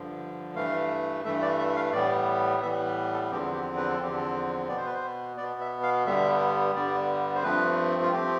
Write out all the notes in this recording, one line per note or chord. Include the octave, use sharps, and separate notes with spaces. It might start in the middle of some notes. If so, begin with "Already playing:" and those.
Already playing: G2 D3 F3
G2 E3 A3 F5
G2 E3 A3 E5
D5
E5
F5
A2 E3 G3 B3 D5
A2 E3 G3 B3 E5
A4
E2 D3 F3 C4 G4
G4
B4
A4
E2 D3 F3 C4 G4
A4
B2 B3 D5
C5
B4
C5
B2 B3 D5
E5
F5
G2 D3 G3 B3 E5
G2 D3 G3 B3 D5
C5
G2 F3 A3 C4 B4
F4
F3 A3 C4 G4